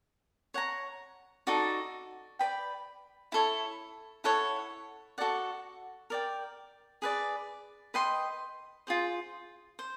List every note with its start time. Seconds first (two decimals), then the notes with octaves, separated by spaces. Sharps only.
0.54 C#5 F#5 A#5
1.47 D#4 F#4 A4 D5
2.39 B4 D5 G5 B5
3.32 E4 A4 C#5
4.24 E4 A4 C#5 F#5
5.18 F#4 A4 D5 F#5
6.10 A#4 D5 G5
7.02 G#4 B4 D5
7.94 B4 D#5 G5 C6
8.87 F4 G#4 C5
9.79 C5